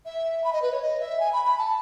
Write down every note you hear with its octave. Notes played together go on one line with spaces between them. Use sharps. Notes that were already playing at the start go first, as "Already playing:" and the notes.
E5
B5
D#5
B4
C#5
D#5
E5
G#5
B5
B5
A5